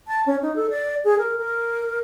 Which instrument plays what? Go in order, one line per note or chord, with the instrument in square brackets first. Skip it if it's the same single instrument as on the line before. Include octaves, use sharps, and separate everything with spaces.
[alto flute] A5
C#4
D#4
A4
D5
G#4
A#4
A#4